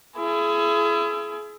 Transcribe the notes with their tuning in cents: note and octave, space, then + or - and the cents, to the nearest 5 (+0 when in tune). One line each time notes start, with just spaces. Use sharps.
E4 +35 G#4 +30